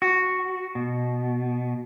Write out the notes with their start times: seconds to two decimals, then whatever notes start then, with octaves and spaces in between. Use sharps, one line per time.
0.02 F#4
0.75 B2